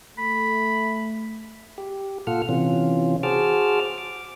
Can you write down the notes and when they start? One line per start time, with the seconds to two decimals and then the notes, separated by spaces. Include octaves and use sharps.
0.18 A3 B5
1.78 G4
2.27 A#2 F4 A4 F#5 F6
2.49 C3 E3 C#4 F4
3.23 F#4 G#4 C5 A5 D6 F6
3.98 D6